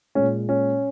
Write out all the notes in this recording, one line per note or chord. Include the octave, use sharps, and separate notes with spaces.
A#2 G#3 C#4
C#4